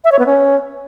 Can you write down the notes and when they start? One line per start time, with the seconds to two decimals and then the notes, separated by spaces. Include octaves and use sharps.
0.04 E5
0.12 C#5
0.19 B3
0.26 C#4